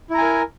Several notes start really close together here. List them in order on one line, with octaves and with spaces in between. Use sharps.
E4 A#5 G#5 A#4